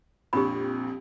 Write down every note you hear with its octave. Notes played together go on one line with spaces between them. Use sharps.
A#1 F2 G4 B5